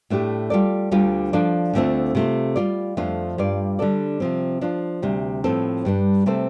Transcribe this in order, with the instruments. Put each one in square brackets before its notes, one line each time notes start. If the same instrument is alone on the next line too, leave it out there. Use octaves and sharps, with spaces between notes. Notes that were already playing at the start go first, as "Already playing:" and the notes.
[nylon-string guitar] A2 A3 D4 G4
G3 F4 A4 D5
D2 D3 G3 F4
F3 D4 A4 D5
D2 D3 A3 C4 F4
C3 A3 F4
G3 F4 D5
F2 F3 A3 D4 F4
G2 G3 F4 D5
D3 G3 D4 A4 D5
C3 F3 C4
F3 D4 F4
D2 C3 G3
A2 F3 C4 A4
G2 G3 D4
C3 A3 C4 A4 C5